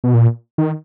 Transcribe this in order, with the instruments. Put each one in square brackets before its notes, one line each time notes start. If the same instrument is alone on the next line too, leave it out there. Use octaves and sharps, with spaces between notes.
[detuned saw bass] B2
A#2
D#3